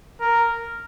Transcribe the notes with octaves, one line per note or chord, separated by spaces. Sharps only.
A#4